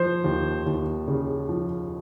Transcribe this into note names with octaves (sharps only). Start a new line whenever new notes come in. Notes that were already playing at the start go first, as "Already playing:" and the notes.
Already playing: F3 C5
D#2
D#2
C#3
F3